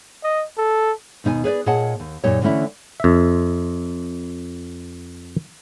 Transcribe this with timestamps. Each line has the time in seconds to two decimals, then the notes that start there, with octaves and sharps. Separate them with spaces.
0.24 D#5
0.58 A4
1.24 D#2 B2 D#4 A4 G#5
1.44 G#4 B4 C#5 D5
1.66 A#2 G#4 C#5 D#5 F#5 A5
2.00 D#2
2.24 F#2 A#2 D#4 G4 C#5
2.42 D3 E3 A3 C#4 E4
3.00 F2 E5